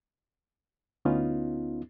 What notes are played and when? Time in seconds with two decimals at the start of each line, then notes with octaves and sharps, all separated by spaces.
1.05 D2 B3 C#4 D#4 F4